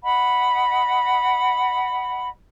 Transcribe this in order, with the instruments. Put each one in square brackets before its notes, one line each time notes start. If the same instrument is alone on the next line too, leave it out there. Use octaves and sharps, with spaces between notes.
[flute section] D#5 F#5 B5